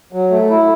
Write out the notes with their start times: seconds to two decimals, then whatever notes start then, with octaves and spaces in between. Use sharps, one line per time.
0.13 F#3
0.31 A3
0.50 E4